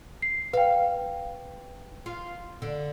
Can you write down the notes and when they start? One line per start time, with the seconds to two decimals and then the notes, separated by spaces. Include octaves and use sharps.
0.22 C7
0.53 B4 F5 G5
2.06 F4
2.62 D3